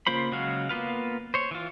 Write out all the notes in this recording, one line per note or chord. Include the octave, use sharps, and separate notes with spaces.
C#3 A#3 F4 C5 B5
C#3 F#3 G#3 F#4 F5
A#3 B3 F4 B4 F5
C5 C#5
E3 F4